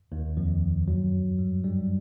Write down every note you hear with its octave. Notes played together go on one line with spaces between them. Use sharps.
D#2 D#3
F2 F3
F#2 F#3
G2 G3
G2 G3